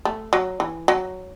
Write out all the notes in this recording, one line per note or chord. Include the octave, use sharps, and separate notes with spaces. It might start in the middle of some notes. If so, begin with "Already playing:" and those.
A3
F#3
E3
F#3